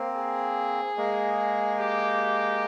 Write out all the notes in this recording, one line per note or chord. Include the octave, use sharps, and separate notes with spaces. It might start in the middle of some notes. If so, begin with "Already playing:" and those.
Already playing: A#3 C4
G#4
G#3 A#3
G4